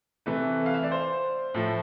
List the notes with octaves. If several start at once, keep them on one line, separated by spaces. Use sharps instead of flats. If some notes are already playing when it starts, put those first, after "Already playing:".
C3 E3 A3 B4
F5
E5
D5
C5
A2 F3 A3